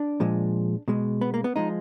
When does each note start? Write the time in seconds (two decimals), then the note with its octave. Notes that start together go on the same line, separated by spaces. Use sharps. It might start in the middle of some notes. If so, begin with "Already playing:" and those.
Already playing: D4
0.20 A#2 F3 G#3
0.88 B2 G#3
1.21 B3
1.34 A#3
1.44 B3
1.56 F3 G#3 D#4